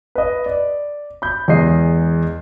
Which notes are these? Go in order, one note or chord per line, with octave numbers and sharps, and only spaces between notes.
B4 D#5
D5
B5 G6
E2 G#3 D#5 C7